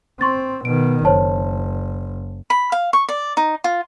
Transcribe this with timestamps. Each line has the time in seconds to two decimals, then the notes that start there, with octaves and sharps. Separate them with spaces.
0.21 C4 C6 C#6 A6
0.65 B2 D#3 D7
1.05 F#1 C5 C#5 A5
2.50 B5
2.72 F5
2.93 C#6
3.09 D5
3.37 D#4
3.64 F4